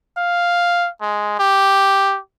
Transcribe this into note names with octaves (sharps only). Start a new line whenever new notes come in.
F5
G#3
G4